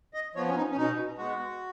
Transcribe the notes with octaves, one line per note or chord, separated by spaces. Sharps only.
D#5
F3 B3 C#5
C#4
D#4
C#4
B2 D#4
G#3 B3 F#4